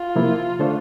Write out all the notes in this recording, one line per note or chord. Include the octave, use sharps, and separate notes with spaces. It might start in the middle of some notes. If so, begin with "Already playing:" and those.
Already playing: F4
C3 F3 A#3 E4
D3 A3 D4 A4 C5